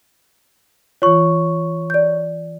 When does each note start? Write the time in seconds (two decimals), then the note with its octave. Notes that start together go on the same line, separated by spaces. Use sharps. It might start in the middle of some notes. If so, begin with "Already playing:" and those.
1.02 E3 F4 C#5 C#6
1.90 D5 G6